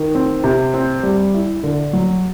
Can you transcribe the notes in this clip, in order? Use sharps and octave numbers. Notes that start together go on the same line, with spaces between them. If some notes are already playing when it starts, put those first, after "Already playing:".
Already playing: D#3
C4
C3
C4
G3
E4
D3
F#3